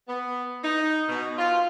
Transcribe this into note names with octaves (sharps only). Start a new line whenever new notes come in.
B3
D#4
B2
F4